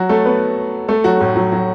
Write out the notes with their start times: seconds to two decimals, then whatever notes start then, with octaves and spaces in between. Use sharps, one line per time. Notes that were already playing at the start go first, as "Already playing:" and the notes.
Already playing: F#3 F#4
0.09 A3 A4
0.25 B3 B4
0.88 A3 A4
1.04 F#3 F#4
1.20 A2 A3
1.36 F#3
1.52 F#3